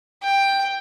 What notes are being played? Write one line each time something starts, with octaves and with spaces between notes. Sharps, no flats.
G5